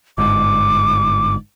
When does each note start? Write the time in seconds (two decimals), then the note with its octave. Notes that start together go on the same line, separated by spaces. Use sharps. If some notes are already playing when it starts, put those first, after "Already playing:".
0.18 G1 G#2 D6